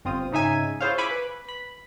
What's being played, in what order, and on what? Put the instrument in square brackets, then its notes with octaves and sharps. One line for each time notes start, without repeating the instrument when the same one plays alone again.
[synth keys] G1 C4 F4 D#6
G#2 C#3 D#4 E5 G#5
E4 F4 G#4 C5 C#5 F5
E5 G#5 B5 C#6 D6 G#6
B4
B5